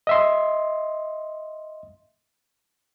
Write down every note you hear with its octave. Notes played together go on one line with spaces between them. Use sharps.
D#5 E5 C6